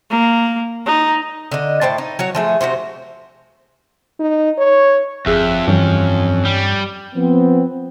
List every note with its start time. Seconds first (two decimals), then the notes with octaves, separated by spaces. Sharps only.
0.11 A#3
0.86 D#4
1.51 D3 D#5
1.81 A2 C5 G5 A5
1.98 D#4
2.19 F#3 F#4 C#5
2.35 F3 A3 G#4
2.61 C3 D#3 F#4 C5
4.19 D#4
4.58 C#5
5.26 G1 F2 G#4 E5 F#6
5.68 G2 E3 C#4
6.45 G3
7.15 F3 B3 C4